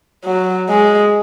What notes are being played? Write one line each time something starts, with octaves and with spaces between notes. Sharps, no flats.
F#3
G#3